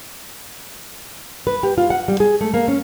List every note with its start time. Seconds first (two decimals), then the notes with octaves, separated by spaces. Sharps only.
1.47 B4
1.63 G4
1.78 F4
1.90 F#5
2.08 G3
2.20 G#4
2.41 A3
2.54 A#3
2.68 C#4